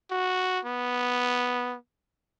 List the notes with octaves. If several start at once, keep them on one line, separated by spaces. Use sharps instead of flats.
F#4
B3